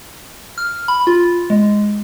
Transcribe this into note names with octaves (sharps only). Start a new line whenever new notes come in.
F6
B5
F4
G#3